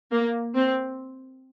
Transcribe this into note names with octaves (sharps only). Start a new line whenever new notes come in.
A#3
C4